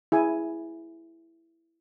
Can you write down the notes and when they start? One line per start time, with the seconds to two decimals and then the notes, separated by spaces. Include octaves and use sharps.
0.12 E4 G#4 G#5